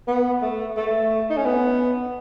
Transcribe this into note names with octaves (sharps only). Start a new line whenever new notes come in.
B3
A3
A3
D#4
C#4
B3